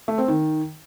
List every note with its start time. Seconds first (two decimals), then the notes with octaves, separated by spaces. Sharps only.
0.08 A3
0.18 C4
0.28 D#3